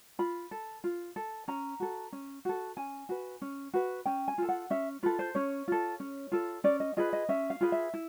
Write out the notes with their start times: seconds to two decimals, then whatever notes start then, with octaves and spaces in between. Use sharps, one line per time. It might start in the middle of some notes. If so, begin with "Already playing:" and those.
0.19 F4 B5
0.51 A4
0.84 F4
1.16 A4
1.48 C#4 A#5
1.80 F#4 A4
2.12 C#4
2.45 F#4 A4
2.77 C#4 G#5
3.09 F#4 B4
3.42 C#4
3.74 F#4 B4
4.06 C#4 G5
4.28 G#5
4.38 F4 A4
4.49 F#5
4.70 C#4 E5
5.03 F4 A4 B4
5.19 C5
5.35 C#4 C#5
5.68 F4 A4
6.00 C#4
6.32 F4 A4
6.64 C#4 D5
6.80 D#5
6.97 F4 G#4 B4 D#5
7.13 D#5
7.29 C#4 E5
7.50 F5
7.61 F4 G#4 B4
7.72 E5
7.94 E4